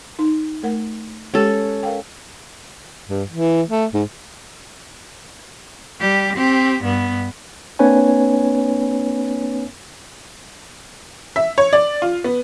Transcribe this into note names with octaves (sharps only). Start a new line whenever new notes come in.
D#4
A3 A#4 F#5
G#3 C#4 G4 A4
A#4 F5 G5
G2
E3
A3
G#2
G3 G4
C4 G4
G2 B3
A#3 C4 D4 B4 C#5 G#5
E5
C#5
D5
F4
B3